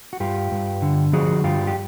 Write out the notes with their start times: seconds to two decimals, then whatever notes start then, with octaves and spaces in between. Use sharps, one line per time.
0.13 F#4
0.20 G2 F4 G4
0.51 G2
0.82 D3
1.13 F3 F#4 G#4
1.44 G2 F4 G4
1.67 G4